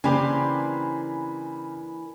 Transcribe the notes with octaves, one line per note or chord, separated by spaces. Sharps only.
C#3 E3 A#3 C4 D4 G4 G#5 B5